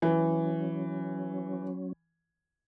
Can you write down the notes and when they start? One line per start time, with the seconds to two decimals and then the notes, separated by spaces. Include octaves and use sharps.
0.02 E3 F#3 C#4